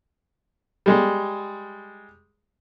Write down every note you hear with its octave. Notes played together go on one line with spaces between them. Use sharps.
G3 G#3